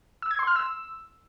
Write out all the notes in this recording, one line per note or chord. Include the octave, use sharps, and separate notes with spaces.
E6
G#6
C6
F6
E6